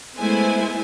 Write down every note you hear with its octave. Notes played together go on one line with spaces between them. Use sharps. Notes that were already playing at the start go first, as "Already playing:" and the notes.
G#3 A3 B3 E4 C5 G#5